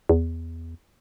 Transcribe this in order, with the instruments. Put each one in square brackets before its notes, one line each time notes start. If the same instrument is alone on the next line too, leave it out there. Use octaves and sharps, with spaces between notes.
[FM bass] E2